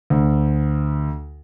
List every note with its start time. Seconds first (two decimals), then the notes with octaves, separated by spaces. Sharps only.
0.10 D2